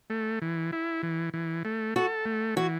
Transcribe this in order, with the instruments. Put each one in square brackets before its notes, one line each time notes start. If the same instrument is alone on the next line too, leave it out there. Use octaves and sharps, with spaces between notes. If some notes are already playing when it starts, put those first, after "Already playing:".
[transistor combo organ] A3
E3
E4
E3
E3
A3
[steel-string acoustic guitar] F#4 [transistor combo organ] A4
[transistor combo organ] A3
[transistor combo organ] E3 [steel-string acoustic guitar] F#4